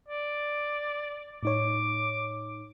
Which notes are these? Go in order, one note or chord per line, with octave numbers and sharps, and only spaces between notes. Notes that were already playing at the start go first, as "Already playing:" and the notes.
D5
A2 D#4 C#5 D6